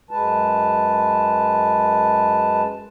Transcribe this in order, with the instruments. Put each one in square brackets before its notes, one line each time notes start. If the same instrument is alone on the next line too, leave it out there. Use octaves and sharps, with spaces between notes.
[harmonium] F#2 G#3 B4 A5